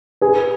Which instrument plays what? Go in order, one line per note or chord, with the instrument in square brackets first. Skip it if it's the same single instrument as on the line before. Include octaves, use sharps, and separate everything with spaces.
[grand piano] G#4 B4